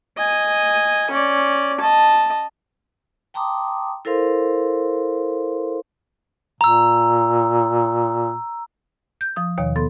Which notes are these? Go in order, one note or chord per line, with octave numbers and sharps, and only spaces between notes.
D#5 G#5
C#4 D5
D#5 A5
G5 A5 A#5 C6 D6 D#6
E4 A4 A#4 C5 F5 C6
A#2 A#5 E6
G6
F3 D#6
D#2 B2 D#3 C#5 F5
B3 A4 C6